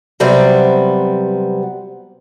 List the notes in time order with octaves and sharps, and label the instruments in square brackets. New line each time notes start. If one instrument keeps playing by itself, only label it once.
[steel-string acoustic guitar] C3 F#3 G3 B3 C4